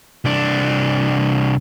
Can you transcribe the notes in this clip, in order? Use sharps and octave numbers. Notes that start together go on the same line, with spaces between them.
C2 D4